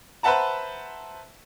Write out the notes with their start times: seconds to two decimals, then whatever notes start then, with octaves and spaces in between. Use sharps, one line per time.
0.23 B4 C5 E5 F#5 A5 A#5